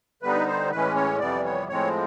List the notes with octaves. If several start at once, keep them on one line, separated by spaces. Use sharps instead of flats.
D3 G3 B3 D#4 B4
C5
A2 E3 G#3 C#4 B4
C#5
F2 C3 E3 G3 B3 D5
C#5
A2 F3 G#3 C4 C#5